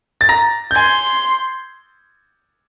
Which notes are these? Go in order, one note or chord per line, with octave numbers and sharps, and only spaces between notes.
A6
A#5 A#6
G6
G#5 C6 G#6